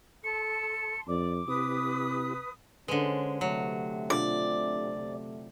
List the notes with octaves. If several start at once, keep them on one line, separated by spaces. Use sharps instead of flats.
A4 A5 C6 C#7
F2 D5 D6
C3 C4 E4 G4 B4 D#6
D3 G#3 C#4 B4 C5
C3 F#3 A3
B2 D4 F4 D5